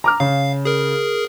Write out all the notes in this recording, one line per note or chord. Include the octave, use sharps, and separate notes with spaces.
A#5 D6 F6
C#3 F5
G#4 A#4